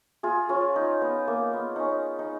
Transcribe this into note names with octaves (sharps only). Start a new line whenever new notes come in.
F4 G#4
C#4 F4
D#4
B3
A#3
B3
C#4 D#4
D#4